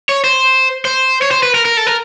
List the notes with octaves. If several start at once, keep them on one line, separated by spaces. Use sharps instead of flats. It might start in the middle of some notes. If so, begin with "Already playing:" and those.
C#5
C5
C5
C#5
C5
B4
A#4
A#4
A4
A#4